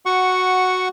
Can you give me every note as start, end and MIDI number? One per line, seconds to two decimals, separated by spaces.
0.06 0.88 66
0.06 0.88 78
0.06 0.88 85